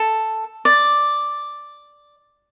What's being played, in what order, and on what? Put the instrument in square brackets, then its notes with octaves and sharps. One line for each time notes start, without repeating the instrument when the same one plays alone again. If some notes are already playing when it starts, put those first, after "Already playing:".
Already playing: [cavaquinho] A4
D5